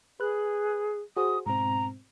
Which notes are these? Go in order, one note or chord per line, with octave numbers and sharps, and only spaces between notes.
G#4 B4 F#6
F#4 G#4 C5 D#6
G#2 B2 C4 A#5